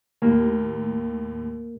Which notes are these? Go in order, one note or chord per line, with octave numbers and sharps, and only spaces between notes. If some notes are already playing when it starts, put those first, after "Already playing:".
D#2 A2 A#3